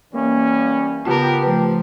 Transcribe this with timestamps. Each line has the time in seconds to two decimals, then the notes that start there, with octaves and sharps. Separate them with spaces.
0.14 E3 G3 A#3 C#4
1.05 C#3 B3 F4 G4 A#4 A5
1.43 F3 A3 B4